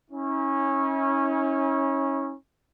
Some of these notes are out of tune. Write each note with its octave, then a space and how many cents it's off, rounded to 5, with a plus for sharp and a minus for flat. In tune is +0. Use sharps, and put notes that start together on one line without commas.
C#4 -15 E4 -45